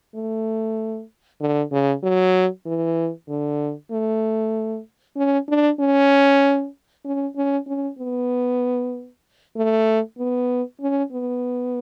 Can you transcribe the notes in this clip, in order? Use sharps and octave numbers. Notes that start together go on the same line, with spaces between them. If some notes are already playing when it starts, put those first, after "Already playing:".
A3
D3
C#3
F#3
E3
D3
A3
C#4
D4
C#4
C#4
C#4
C#4
B3
A3
B3
C#4
B3